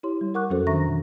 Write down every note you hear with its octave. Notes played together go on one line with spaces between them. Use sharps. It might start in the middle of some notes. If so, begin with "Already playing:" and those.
E4 G4 C#5 C6
G3
A#4 F#5 C#6 D6 F#6
F2 F#3 C#4 F#4 A4 C5
D#3 D4 E5 A#5 C#6 A#6
B2 E3